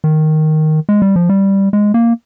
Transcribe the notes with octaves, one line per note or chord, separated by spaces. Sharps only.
D#3
G#3
G3
F3
G3
G#3
A#3